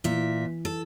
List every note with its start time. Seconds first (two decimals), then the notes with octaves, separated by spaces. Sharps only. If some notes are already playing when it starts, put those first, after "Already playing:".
0.04 A#2 E3 E5
0.65 A4